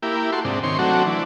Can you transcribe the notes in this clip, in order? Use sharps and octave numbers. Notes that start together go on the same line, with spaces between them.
A#3 E4 G4
F#4 A4 C6
G#2 C3 D4
C3 D#3 C#5 C6
F#3 A3 C4 D4 F#4
E3 D4